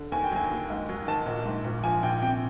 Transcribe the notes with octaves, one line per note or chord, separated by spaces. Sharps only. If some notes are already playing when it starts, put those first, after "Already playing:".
Already playing: D3
D#2 G#5
G5
F#3 G#5
D#2
G#2
F#3
D#3 A5
A#1
G#2
A#1
F3 G#5
A#1 G5
C3 G5